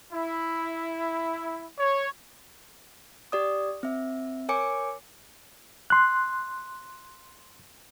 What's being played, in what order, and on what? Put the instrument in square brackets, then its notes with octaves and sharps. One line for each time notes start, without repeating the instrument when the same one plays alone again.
[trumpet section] E4
C#5
[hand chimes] G4 D5 D#6
C4 E5
A#4 C#5 G#5 D6 C#7
[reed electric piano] C6 F#6